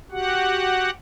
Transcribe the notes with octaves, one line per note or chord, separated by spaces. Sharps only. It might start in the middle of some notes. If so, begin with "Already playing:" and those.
F#4 G4 F#5